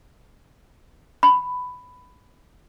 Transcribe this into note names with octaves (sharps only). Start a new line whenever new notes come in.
B5